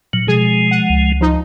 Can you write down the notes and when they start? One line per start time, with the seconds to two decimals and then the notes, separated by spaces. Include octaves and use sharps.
0.13 A#2 F#3
0.28 B2 F3 G#3 G#4
0.71 F#5
0.90 C#2
1.21 F3 D#4